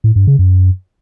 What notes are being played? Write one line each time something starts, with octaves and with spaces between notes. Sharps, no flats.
A2
G2
C#3
F#2